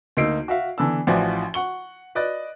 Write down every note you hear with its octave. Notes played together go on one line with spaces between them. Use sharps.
D2 A#3 D#4 E6 C7 D7
F#4 E5 F5
D3 E3 B3 A5 E6
A1 F3 E4 F#4 D5 G#5
F#5 C#6 G7
B4 D5 D#5 F#6 A6